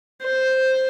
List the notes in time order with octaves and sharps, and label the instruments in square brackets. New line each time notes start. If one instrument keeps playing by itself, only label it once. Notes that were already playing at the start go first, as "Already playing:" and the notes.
[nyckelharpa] C5